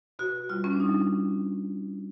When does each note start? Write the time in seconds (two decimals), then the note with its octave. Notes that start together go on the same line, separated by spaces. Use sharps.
0.19 B2 F#4
0.49 G3 F4
0.64 C#4
0.73 D4
0.80 G3 D#4